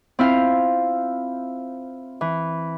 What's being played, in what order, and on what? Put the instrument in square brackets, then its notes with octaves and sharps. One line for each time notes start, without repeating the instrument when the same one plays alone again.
[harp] C4 E4 F4 F5
E3